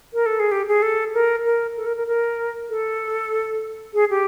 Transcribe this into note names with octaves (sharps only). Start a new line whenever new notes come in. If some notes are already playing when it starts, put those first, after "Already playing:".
A#4
A4
G#4
G4
G#4
A4
A#4
A#4
A4
A#4
A#4
A#4
A4
G#4
G4